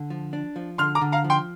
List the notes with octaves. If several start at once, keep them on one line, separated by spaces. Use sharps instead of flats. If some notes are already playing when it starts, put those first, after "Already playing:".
Already playing: D3
F3
D4
F3
D3 C6 F6
A#5 D6
D3
F5 A#5
F3
G5 C6